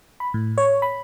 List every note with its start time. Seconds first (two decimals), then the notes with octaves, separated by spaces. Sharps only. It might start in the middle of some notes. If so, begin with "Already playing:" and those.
0.20 B5
0.34 A2
0.58 C#5
0.82 B5